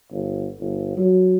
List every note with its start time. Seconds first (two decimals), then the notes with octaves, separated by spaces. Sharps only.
0.12 G1
0.60 G1
0.97 F#3